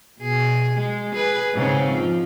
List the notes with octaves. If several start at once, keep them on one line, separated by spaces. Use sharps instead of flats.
B2 G#4
G#3
G#4 B4
G#2 C#3 C4
F3